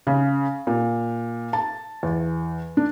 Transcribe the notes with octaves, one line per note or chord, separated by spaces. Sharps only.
C#3
A#2
A5
E2
D4